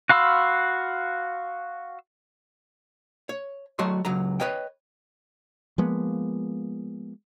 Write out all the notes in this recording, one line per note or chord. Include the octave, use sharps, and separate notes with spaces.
F#4 F5 B5 C6 E6
C#5
F#3 A3 F#4 D#5 C6
C#2 F#3 A#5
B4 C#5 D#5 G5
F3 G#3 A#3 B3